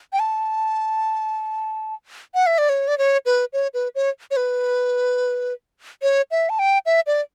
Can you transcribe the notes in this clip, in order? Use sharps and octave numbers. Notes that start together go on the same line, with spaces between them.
G5
A5
F#5
E5
D5
C#5
D5
C#5
B4
C#5
B4
C#5
C#5
B4
C#5
E5
A5
G5
E5
D5